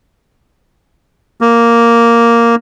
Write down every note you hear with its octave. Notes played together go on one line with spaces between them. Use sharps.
A#3